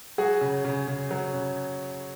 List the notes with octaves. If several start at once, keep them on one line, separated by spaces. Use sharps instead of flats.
F#3 F#4 G#4
C#3
C#3
C#3
F#3
C#3